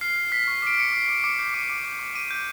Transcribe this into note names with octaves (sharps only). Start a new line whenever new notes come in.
F6 C7
F6
F6 B6
C#6
D6 D7
F6 C#7
D6 C7
D6
D6 C#7
G6
D6 D#7
D6
G6
D6
D6 D#7
G6